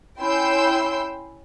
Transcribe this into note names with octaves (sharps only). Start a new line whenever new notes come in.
C#4 E4 G5 C6 E6 G6